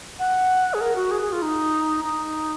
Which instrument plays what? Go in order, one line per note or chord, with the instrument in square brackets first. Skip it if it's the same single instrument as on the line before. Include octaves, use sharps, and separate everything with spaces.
[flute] F#5
G#4
A#4
F#4
G#4
G#4
F4
D#4
D#4